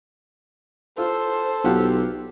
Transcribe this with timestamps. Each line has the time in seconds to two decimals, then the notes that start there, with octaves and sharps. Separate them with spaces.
0.98 F4 A4 C5
1.64 B1 F4 G4 F#5